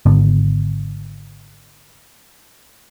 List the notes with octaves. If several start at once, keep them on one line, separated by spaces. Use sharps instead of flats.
G#1 G#2 D3 B3